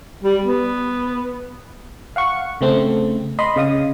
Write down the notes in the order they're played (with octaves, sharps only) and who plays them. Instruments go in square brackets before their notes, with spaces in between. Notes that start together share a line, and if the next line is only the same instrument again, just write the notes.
[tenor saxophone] G3
B3
[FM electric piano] F5 F#5 C#6
C#3 A3 C4
D#5 B5 C6
C#3 D#5 F5 D#6